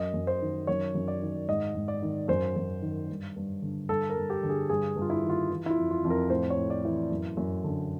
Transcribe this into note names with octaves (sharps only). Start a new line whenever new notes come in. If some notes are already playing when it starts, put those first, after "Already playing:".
Already playing: F#2 D#5
F#2
C5
D#3
F#2 C#5
F#2
D5
D#3
G#2 D#5
G#2
D5
D#3
F#2 C5
F#2
D#3
G2
G2
D3
G2 A4
A#4
G2
G4
D3
G#4
G2 G#4
G2
F4
E4
D#3
F4
E3
E4
F4
F2
F4
F2
A#4
A2 C5
C#5
A2
D5
E3
F#2
F#2
D3